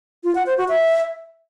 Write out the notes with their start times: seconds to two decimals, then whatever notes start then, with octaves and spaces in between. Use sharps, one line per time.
0.24 F4
0.35 F#5
0.46 C5
0.58 F#4
0.69 E5